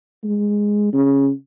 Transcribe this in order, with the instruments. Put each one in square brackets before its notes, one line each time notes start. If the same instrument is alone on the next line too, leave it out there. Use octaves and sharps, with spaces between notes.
[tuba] G#3
C#3